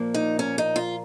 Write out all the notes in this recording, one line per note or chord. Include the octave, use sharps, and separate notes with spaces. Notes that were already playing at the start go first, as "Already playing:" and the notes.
Already playing: A#2 F3 A#3
D#4
C#4
D#4
F4